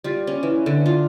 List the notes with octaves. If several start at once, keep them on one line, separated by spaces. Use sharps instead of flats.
G3 F4
C#4
E3
D3
F4